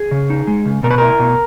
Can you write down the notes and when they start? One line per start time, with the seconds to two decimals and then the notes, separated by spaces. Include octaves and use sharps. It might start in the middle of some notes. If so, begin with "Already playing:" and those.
Already playing: G#4
0.11 C#3
0.30 D#4
0.47 G#3
0.65 C#3
0.83 B2 A#4
0.90 B4
0.98 E4 A#4
1.19 B2